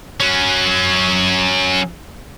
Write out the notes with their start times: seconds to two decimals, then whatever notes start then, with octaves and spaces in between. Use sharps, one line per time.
0.20 F#3 C#4